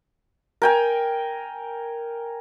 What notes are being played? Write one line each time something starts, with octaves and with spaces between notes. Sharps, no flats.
A#4 G5 G#5